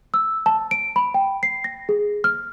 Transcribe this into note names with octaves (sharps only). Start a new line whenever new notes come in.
E6
A5
D7
B5
G5
C7
A#6
G#4
F6